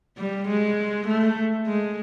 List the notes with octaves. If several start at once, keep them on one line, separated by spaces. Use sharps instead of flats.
G3
G#3
A3
G#3